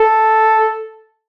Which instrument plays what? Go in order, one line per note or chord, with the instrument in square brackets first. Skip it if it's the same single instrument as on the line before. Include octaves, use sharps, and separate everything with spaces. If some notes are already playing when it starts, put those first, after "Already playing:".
Already playing: [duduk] A4